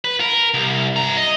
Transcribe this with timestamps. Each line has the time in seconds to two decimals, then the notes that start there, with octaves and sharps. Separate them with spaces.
0.04 B4
0.20 A#4
0.54 C2
0.96 G2 A#5
1.17 D#5